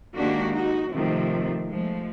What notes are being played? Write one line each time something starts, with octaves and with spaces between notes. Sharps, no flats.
D#3 G#3 A#3 D4 F#4 G4
D#4 F#4
C3 D#3 F3 A3 C4
F3 G#3 A3